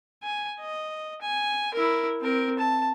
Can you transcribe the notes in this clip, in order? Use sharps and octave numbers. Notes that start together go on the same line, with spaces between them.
G#5
D#5
G#5
E4 A#4
C4 A#4
A5